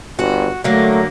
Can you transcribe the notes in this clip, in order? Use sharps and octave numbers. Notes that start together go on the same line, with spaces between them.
G1 F#4
D3 F#3 A3 A#3